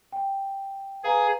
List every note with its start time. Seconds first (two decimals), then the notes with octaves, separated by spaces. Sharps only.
0.12 G5
1.04 G#4 B4 F5 A#5